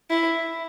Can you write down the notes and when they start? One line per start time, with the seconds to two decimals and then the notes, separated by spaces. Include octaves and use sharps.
0.10 E4